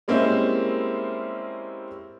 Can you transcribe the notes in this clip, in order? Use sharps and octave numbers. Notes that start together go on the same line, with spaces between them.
G3 G#3 A#3 C4 C#4 E4